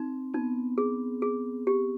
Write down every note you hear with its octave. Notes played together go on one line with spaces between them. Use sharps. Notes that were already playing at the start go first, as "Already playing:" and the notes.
Already playing: C4 D#4
B3 D#4
G#4
G#4
G4